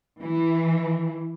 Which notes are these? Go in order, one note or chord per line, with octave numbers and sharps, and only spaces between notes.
E3